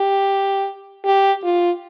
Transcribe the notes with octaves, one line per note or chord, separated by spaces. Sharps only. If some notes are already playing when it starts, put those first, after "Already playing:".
Already playing: G4
G4
F4